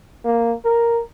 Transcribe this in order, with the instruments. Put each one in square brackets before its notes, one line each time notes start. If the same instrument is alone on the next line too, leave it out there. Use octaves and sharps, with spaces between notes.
[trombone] A#3
A#4